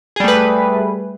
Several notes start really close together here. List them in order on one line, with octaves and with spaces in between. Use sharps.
G#4 G3 A3 B4